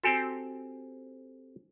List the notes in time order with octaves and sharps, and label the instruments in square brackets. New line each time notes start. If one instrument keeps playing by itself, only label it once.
[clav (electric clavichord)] C4 G4 A4 [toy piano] F#4 G#5